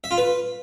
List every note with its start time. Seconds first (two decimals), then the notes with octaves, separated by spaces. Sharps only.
0.04 E5
0.11 F4
0.18 B4